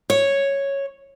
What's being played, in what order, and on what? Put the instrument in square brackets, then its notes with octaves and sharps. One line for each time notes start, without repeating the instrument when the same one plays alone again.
[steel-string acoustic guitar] C#5